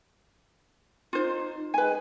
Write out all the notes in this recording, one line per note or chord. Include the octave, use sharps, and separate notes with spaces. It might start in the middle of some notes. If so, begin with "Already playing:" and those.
D#4 F4 C5
G#3 B4 G#5